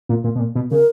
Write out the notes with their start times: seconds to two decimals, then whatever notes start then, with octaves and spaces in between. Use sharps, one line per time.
0.09 A#2
0.24 A#2
0.36 B2
0.39 A#2
0.55 B2
0.71 C#3 A#4